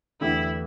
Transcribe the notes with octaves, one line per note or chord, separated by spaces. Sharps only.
E2 D3 A3 D4 E4 G4